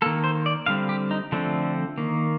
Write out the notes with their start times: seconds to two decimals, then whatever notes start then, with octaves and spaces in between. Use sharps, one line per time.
0.02 D#3 A#3 A4
0.24 C5
0.46 D5
0.66 D3 G3 C4 F5
0.89 G4
1.11 D#4
1.32 D3 F3 A3 C4 D4
1.98 D#3 A#3